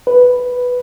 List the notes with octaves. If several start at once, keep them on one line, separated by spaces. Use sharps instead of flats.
B4